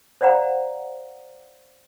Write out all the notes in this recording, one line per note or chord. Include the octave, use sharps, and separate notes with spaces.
C5 D5 F5 F#5 A#5